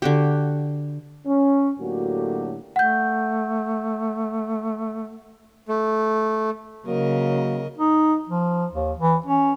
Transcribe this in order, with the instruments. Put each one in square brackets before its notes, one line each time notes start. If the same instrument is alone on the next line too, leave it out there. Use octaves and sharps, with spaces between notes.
[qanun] D3 F#4 G4
[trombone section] C#4
A2 D3 F#3 A#3 F#4 G4
[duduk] A3 [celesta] F#5 G6
[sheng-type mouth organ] A3
[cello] C#3 [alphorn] F#3 [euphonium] A#3 [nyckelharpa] A#4 D#5
[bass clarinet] D#4
F3
D#2
E3
C#4